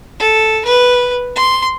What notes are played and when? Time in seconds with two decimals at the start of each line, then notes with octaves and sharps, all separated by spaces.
0.20 A4
0.65 B4
1.36 C6